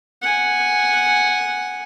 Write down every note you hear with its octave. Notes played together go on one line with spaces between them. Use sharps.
F#5 G#5